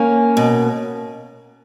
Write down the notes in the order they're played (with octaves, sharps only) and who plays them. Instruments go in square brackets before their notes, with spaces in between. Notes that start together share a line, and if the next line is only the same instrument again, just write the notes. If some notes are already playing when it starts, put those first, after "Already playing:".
Already playing: [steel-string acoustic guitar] A#3 C#4
B2